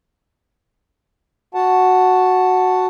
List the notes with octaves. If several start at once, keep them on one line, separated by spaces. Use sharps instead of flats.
F#4 F#5 A5